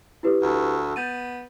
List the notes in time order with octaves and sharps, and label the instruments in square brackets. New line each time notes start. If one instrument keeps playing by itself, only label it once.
[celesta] E4 G4 B4
[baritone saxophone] D2
[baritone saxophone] B3 [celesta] G6 A6 D#7